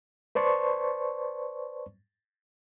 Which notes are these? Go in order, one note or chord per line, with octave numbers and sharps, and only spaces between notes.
B4 C5 D5 A5 C6 C#6